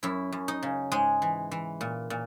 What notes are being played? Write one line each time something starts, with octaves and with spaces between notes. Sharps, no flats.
F#2 E4
F#2
D#4
C#3
G#2 G#3
E3
E3
A#2
A#2